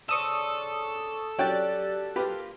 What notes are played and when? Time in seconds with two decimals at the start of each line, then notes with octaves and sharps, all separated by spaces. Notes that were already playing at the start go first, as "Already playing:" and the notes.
0.09 C#3 D4 A4 C5 C#6 D#6 E6
1.39 F#3 C#4 G4 D5 G5 F#6 A6
2.16 A#3 F4 G4 B4